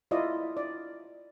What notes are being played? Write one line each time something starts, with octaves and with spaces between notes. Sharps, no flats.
E4 F4 D5 D#5
D5